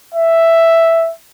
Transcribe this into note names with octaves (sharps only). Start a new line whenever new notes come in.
E5